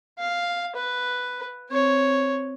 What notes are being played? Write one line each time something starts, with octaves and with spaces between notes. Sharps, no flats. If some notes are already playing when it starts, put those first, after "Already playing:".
F5
B4
C4 C#5